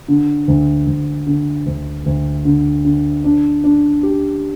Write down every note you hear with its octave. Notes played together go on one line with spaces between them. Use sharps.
D3
D2
D2
D3
D2
D2
D3
D3
D4
D4
G4